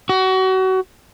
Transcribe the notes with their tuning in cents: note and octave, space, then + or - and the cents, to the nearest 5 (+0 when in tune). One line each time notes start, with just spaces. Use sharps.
F#4 +30